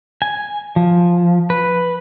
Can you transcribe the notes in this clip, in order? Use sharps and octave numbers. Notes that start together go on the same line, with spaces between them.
G#5
F3
B4